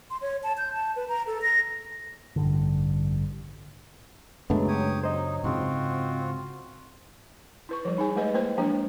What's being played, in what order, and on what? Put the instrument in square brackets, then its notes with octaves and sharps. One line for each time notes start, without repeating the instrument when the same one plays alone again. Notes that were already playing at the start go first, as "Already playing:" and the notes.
[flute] C6
C#5
A5
G6
A5
B4
A#5
A4
A#6
[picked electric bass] A1 G2 D3
[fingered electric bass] F#2 C#3 D4 [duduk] F#3 [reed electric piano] G#3 A3 B3
[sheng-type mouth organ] G4 C#5 D#6
[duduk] F#3 [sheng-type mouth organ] D#4 [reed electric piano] C5 D#5
[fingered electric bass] G#2 C#3 [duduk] C4 [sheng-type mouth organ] F4 F#4
[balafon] E4 B4 C#6
F3 G3
D#4 G#4 G#5
G#3 A3 G4 B4 D#5
A#3 E4 B4 C5
F3 F#3 G#3 A#3 D4 G4